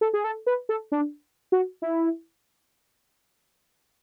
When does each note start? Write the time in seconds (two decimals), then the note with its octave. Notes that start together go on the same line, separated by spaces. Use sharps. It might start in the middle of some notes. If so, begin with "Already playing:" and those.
0.01 A4
0.14 G#4
0.24 A4
0.47 B4
0.69 A4
0.92 D4
1.52 F#4
1.82 E4